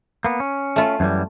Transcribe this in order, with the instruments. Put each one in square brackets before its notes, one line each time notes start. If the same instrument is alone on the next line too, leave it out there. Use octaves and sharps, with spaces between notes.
[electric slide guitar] A#3 B3
C#4
[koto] A3 F4
[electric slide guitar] F#2 E3 G3